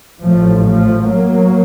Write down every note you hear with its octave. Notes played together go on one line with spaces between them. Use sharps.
A1 A2 F3 A3
F3 A3
F#3 A#3